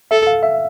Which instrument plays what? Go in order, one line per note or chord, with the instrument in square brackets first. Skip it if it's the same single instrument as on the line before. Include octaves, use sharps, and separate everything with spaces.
[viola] A4 [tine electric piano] E5
[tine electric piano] F5
E5